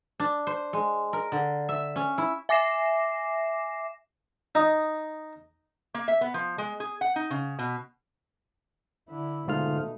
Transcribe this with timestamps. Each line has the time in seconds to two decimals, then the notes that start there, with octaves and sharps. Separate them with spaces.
0.20 D4
0.47 C5
0.73 G#3
1.13 A#4
1.32 D3
1.69 E5
1.96 C#4
2.18 E4
2.49 E5 G#5 D6 A#6 C7 E7
4.55 D#4 D#6
5.94 A#3
6.08 E5
6.21 B3
6.34 F3
6.58 G#3
6.80 G#4
7.01 F#5
7.16 D#4
7.30 C#3
7.59 B2
9.09 D3 E4
9.48 G#2 B2 D3 A3 D#4 F4 F6